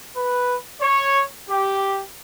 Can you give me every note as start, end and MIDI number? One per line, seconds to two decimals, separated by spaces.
0.16 0.56 71
0.80 1.23 73
1.50 2.01 67